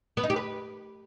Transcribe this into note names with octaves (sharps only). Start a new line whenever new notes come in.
B3
D#4
G4
B4